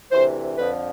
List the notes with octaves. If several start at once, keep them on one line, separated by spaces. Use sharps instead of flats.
D2 C3 E3 C5
F2 D3 F3 B4